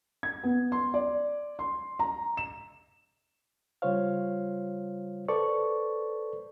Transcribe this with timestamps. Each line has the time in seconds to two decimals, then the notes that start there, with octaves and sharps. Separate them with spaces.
0.23 G#6
0.43 B3
0.72 C6
0.94 D5
1.59 C6
1.99 A#5
2.37 E7
3.82 C#3 G3 F4 C5 C#5 F5
5.28 A4 B4 C5 D5 C#6